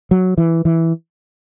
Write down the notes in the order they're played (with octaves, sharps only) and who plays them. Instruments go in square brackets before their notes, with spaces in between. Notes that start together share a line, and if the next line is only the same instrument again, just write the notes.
[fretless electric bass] F#3
E3
E3